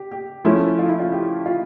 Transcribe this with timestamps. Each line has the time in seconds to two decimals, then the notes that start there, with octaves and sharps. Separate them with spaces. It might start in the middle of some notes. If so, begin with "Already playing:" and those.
Already playing: G4
0.12 G4
0.45 F3 A3 C#4 E4
0.79 F4
0.89 E4
0.99 F4
1.12 G4
1.46 F4